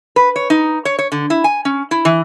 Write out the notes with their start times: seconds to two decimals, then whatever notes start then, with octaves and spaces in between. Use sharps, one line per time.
0.16 B4
0.36 C#5
0.50 D#4
0.85 C#5
0.99 C#5
1.12 D3
1.30 E4
1.44 G#5
1.65 C#4
1.91 E4
2.05 E3